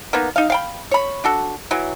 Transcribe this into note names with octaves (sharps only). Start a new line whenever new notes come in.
A#3 B3 D#4
D#4 F5
F5 G5 B5
C#5 B5
D4 F#4 A4
E3 F#3